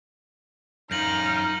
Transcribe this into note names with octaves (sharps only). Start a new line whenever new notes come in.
F#2 D#4 F4 F6 G6 A#6 F#7